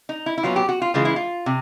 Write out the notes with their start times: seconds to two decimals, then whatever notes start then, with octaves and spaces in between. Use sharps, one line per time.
0.09 D#4
0.26 E4
0.38 E4
0.43 A#2 F#3 B3 F4
0.56 G4
0.69 F#4
0.82 F4
0.94 C#3 E3 G#3 F4
1.05 E4
1.16 F4
1.46 C3